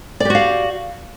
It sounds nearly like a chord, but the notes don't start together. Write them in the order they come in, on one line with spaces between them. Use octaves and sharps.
D5 G4 F#4 F5